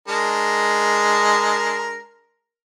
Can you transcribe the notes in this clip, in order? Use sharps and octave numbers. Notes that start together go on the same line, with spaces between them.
G#3 D4 A#4